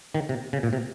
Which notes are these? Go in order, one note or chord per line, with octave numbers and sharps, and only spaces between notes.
D#3
C3
C#3
A#2
C3